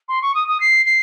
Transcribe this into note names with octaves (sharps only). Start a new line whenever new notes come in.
C6
C#6
D#6
D#6
C7
C7